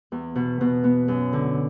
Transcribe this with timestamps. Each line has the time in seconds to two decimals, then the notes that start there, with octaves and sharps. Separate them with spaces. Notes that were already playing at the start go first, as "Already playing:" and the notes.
0.12 E2
0.35 B2
0.61 B2
0.84 B3
1.08 F#2
1.33 D3